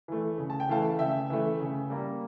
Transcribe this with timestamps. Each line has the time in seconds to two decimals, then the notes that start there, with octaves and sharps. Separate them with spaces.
0.08 E3 A3
0.38 C#3
0.50 A5
0.60 G5
0.69 E3 A3 F5 A5
0.99 C#3 E5 G5
1.30 E3 A3
1.60 C#3
1.90 G3 A#3